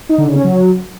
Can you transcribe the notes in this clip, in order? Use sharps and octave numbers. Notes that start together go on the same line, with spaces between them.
D#4
D3
C#3
C#4
F#3